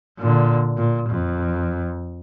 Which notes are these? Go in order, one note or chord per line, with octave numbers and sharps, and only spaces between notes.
A#2 D3
A#2
F2